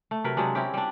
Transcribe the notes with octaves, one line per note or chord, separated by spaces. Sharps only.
A3
C3 F#3 A#4 B4
C3 F#3 G#3 D4
C4 C#4 E4 G4
G3 D4